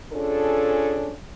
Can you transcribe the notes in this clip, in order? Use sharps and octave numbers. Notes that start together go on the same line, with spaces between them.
C#4 D4 F4 G#4 A4